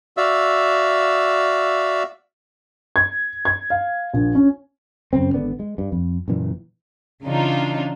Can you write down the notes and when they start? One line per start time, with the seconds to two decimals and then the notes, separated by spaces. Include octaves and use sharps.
0.17 F#4 D5 E5 F5 E6
2.96 G#6
3.45 G#6
3.70 F5
4.14 A#1
4.35 C#4
5.13 F#2 C#3 C4
5.34 G#1 D3 B3 D4
5.59 G#3
5.78 G2
5.92 F2
6.28 F#1 A#2 E3
7.24 C#3 E3 D4 D#4 F4